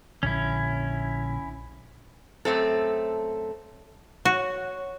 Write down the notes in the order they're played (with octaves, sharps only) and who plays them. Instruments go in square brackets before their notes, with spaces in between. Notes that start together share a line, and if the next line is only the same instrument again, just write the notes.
[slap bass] A#1 D3 [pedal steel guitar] C#4 E4
[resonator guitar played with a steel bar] F#2 A3 C4 A4
[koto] F#4 [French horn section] C#5